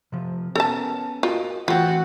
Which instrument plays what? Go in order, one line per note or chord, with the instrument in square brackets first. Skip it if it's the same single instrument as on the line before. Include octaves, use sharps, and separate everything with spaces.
[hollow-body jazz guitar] C3 F3
[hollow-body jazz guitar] B3 C#4 A#4 [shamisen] A4 A5
[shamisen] F4 [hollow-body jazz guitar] F#4 A#4 D#5
[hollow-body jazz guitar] E3 A3 [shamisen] C4 F4 [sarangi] F#4